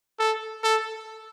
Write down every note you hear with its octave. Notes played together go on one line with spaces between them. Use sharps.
A4
A4